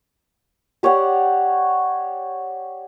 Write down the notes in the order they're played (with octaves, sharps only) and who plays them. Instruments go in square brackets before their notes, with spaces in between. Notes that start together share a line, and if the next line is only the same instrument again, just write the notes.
[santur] G4 C#5 D5 F#5